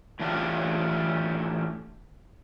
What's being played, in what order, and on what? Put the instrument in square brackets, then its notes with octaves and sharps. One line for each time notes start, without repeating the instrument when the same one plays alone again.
[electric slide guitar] A2 E3 D4 E4 F4 G4